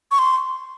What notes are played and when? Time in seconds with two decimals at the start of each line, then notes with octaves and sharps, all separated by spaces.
0.11 C#6
0.19 C6